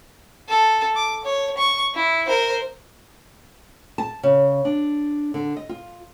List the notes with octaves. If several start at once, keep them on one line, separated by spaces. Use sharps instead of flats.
A4
D6
C#5
C#6
E4
A#4 C5
A5
C#3
D4
D3
D#5
F4